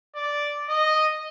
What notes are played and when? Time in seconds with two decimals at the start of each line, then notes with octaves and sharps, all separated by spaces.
0.15 D5
0.69 D#5